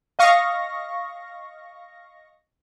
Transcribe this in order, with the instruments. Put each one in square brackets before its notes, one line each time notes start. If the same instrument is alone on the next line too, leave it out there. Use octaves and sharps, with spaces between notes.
[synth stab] D#5 F5 C#6 A#6